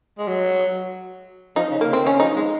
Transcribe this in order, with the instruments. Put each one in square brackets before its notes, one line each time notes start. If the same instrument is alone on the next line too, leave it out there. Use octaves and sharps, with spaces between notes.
[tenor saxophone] G#3
F#3
[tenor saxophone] F3 [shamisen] D#4
[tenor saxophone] C#3
[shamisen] A#3
[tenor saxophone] C#3
[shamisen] C4
[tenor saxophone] D#3 [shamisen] C#4
[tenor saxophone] F3 [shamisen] D#4
[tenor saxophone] G#3